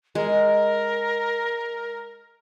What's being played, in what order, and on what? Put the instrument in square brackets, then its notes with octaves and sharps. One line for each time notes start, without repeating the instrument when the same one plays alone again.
[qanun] G#3 [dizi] A#4